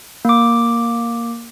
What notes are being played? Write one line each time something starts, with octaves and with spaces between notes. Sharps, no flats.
A#3 D6